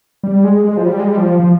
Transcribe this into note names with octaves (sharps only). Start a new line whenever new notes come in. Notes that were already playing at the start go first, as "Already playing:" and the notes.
G3
G#3
G#3
F3
G3
G#3
G3
F3
F3